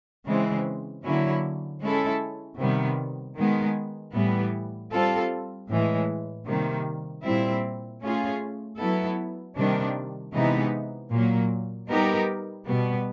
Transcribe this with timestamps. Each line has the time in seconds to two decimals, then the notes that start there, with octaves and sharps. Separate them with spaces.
0.27 C#3 E3 G#3 C4
1.04 D3 F#3 A#3 C#4 E4
1.82 G#3 C#4 E4 A4
2.59 C3 D#3 G3 B3
3.37 D#3 G#3 B3
4.15 A2 E3 G3 B3
4.92 G3 C4 F4 A4
5.69 A2 E3 G#3
6.47 C3 D#3 G3 A#3
7.24 A#2 G3 C4 E4
8.02 A3 C#4 F4 G#4
8.79 F#3 B3 E4 A4
9.57 C3 D#3 G3 A#3 D4
10.34 C3 E3 G#3 B3 D#4
11.12 A#2 F#3 A#3
11.89 G3 B3 D#4 G4 A#4
12.67 B2 G3 B3